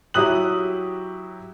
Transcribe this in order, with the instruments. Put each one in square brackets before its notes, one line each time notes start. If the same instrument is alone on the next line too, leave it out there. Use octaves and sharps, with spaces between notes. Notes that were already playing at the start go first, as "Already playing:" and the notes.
[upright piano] F#3 E4 G4 D#6 F#6 F#7